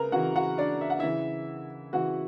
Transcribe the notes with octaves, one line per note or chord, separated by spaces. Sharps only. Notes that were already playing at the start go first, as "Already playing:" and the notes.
Already playing: C#3 A#4 B4 A#5
C#3 E3 F#4 F#5
F#4 F#5
D4 D5
E5
F#5
C#3 E3 E4 E5
C#3 E3 F#4 F#5